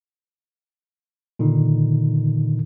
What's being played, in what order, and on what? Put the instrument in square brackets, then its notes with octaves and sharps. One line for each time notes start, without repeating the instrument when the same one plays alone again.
[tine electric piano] A#2 D3 D#3 D#4